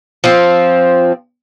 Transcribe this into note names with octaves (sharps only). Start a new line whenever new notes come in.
F3 C4